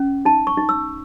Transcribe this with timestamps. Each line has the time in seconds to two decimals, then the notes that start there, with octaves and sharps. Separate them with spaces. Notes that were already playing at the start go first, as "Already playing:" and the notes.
Already playing: C#4
0.25 D#4 A5
0.47 C#6
0.57 D#4
0.69 E6